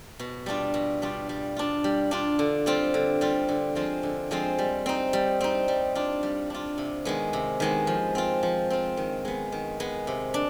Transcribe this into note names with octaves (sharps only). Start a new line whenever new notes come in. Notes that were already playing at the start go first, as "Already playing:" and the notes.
B2
G3 D4 F4
B2
G3 D4 F4
G3
D4 F4
G3
D4 F4
D3
G3 C4 F4
D3
G3 C4 F4
D3
F3 G#3 C4 F4
D3
F3 G#3 C4 F4
G3
C4 D#4
G3
C4 D#4
G3
D4 F4
G3
D4 F4
C3
D#3 G#3 B3
C3
D#3 G#3 B3
F3
C4 F4
F3
C4 F4
D#3
G#3 B3
D#3
G#3 B3
C3
D4